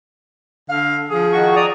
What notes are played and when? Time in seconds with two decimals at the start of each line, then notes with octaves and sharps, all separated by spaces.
0.69 D3 F5
1.11 F3 G#4
1.33 D#3 F#4 C#6
1.56 D5 A#5 D#6